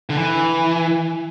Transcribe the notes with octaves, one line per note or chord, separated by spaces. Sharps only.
D3
E3